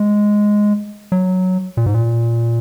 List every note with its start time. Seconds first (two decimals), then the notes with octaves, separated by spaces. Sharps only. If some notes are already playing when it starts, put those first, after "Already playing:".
Already playing: G#3
1.12 F#3
1.77 A#2
1.86 G#2
1.94 A#2